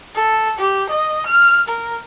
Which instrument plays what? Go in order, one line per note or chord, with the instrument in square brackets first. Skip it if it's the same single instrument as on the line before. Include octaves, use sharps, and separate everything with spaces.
[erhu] A4
G4
D#5
F6
A#4